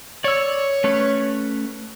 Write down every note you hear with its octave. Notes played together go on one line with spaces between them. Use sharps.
C#5 D5 E6
A3 C#4 B4